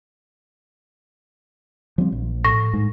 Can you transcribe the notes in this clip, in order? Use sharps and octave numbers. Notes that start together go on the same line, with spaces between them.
F3 G3 C4
A#1
A2 C#6 A#6
G#2